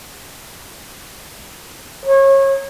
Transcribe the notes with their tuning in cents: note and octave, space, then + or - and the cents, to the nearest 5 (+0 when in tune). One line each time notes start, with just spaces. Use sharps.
C#5 -30